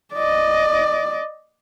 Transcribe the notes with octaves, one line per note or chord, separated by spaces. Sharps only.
D5 D#5